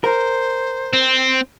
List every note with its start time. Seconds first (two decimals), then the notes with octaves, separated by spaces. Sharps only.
0.04 A#4 C5
0.93 C4